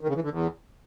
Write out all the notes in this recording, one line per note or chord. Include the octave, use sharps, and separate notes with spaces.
D#3
C#3
E3
D3
E2